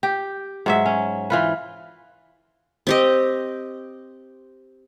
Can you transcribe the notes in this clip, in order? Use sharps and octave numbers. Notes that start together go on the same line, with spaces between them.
G4
G#2 F#3 E5
C#4
E3 F4 B4
C4 G4 D#5